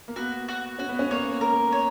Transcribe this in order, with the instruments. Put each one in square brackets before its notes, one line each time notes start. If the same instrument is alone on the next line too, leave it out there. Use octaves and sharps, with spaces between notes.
[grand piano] A#3
[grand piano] B3 [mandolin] F#4
[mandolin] F#4
[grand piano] C#4 [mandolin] F#4
[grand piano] B3
C#4
[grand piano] A#3 [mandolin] C#5
[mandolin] A#4
C#5